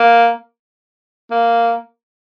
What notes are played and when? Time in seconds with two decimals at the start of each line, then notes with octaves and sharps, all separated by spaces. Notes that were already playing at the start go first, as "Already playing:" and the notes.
Already playing: A#3
1.31 A#3